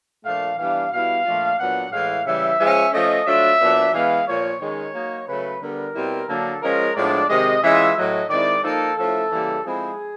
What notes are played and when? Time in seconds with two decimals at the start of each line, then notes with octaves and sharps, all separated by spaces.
0.25 A#2 F3 A3 D4 F5
0.58 E3 G3 B3 D4 F5
0.92 B2 G3 B3 E4 F5
1.25 A#2 F3 A3 D4 F4
1.59 A#2 F#3 B3 D4 F#5
1.92 A2 E3 G#3 F5
2.27 C#3 E3 G3 E5
2.60 F3 G#3 C#4
2.93 F3 A3 C#4 D#5
3.27 F#3 A3 D4 F4 E5
3.61 A#2 F#3 B3 D4
3.94 E3 G#3 B3 F5
4.28 A#2 F3 A#3 C#5
4.61 D#3 G#3 C#4 C#5
4.94 F#3 A#3 D#4
5.28 C#3 F#3 A3 B4
5.61 D3 G3 B3 A#4
5.95 B2 G3 C4 E4
6.29 D3 F#3 A#3 D4 A4
6.62 F3 G#3 C#4 F4 A#4
6.96 A2 F3 G#3 B3 D4 D5
7.29 C3 D#3 G#3 C4 D#5
7.63 E3 G#3 C#4 F4 E5
7.97 A2 F#3 A3 D#5
8.30 D#3 G#3 C4 E4 D5
8.64 F3 A#3 D#4 A4
8.97 F3 A3 C#4 E4 A4
9.30 C#3 E3 G3 A#3
9.64 F3 G#3 C4 E4 G#4